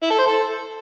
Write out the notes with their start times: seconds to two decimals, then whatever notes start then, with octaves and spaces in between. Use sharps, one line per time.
0.02 E4
0.10 A4
0.18 C5
0.26 A4